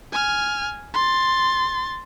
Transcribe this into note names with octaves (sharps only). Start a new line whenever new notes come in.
G#5 F6
C6 A6